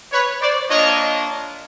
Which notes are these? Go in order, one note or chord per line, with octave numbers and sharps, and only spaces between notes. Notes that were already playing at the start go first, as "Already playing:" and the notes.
B4 C#5
C5 D5
A#3 D4 F4 C#5 D#5